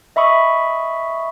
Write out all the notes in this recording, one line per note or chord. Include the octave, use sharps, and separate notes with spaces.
D#5 E5 B5 C#6 D#6